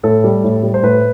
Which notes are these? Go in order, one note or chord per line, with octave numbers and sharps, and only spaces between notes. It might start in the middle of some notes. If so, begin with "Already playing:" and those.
A2 A4
G3
A2
G3
C5
A2 B4